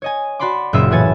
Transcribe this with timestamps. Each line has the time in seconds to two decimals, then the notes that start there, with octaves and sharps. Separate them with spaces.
0.02 C#5 D#5 G#5
0.39 F#4 D5 B5 C6 D6
0.73 F#1 A#2 F4 D#5 E5 E6
0.91 A2 E3 B4 C#5 G#5 A6